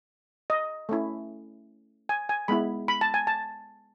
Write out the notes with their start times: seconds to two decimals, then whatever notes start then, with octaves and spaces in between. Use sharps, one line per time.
0.50 D#5
0.89 A3 C#4 E4
2.09 G#5
2.29 G#5
2.48 G#3 B3 E4 B5
2.88 B5
3.01 A5
3.14 G#5
3.27 A5